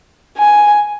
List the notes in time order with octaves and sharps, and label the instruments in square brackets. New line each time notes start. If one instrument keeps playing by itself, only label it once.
[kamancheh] G#5